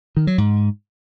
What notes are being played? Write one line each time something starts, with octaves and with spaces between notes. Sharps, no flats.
D#3
F#3
G#2